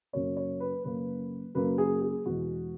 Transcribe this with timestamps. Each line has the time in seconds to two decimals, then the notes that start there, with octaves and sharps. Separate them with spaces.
0.13 F#2 C#3 F#3 A#3 C#5
0.37 C#5
0.60 B4
0.84 F#2 C#3 F#3 A#3 B4
1.55 F#2 C#3 F#3 A#3 B4
1.78 G#4
2.02 G#4
2.25 E2 B2 G#3 B3 F#4